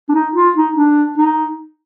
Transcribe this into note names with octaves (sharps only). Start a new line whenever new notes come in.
D4
D#4
F4
D#4
D4
D#4